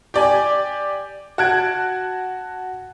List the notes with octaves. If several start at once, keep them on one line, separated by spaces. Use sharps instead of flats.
G4 D5 G#5
F#4 A5 F#6 G#6 D7